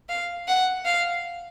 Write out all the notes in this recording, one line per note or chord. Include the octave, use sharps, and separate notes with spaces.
F5
F#5
F5